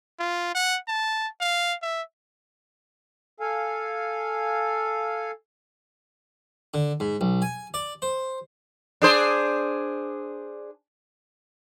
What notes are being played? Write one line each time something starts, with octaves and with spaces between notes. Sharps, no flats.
F4
F#5
A5
F5
E5
A4 F5 G#5
D3
G#2
B1
G#5
D5
C5
D4 G#4 C5